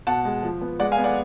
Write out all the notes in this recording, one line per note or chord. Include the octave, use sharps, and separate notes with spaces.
B2 F#5 A5
G#3
F3
B3
G#3 D5 F#5
F5 G#5
B3
D5 F#5